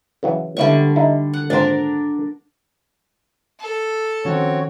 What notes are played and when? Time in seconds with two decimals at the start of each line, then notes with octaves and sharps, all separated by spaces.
0.23 C#3 E3 F#3
0.57 C#2 D3 G3 B3 E4 C#6
0.96 D#4 E4
1.34 F#5
1.50 G#1 A#2 D4 A#4 C5
3.60 A4
4.25 D#3 F3 C4 C#4 F#4 C#5